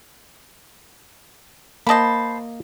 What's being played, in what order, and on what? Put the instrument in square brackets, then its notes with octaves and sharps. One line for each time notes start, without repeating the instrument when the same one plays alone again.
[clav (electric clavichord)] A#3 D#5 [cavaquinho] C5 A5 B5